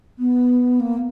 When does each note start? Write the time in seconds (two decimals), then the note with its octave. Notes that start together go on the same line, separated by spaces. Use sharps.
0.19 B3
0.80 A#3